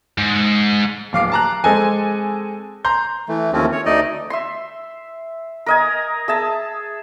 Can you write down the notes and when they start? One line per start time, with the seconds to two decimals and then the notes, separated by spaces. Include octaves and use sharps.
0.18 G#2
1.13 D1 F5 D6 C7
1.32 A5 A#5 F#6
1.64 G#3 C4 A4 D#5 G#5
2.85 A#5 C6 G6
3.28 E3 A3
3.53 D#2 F3 A3 C4 C#4
3.72 C#5
3.86 D2 A3 D#4 D5 D#5
4.30 E5 C6
5.66 A#4 D#5 G#5
6.28 G#4 E5 A5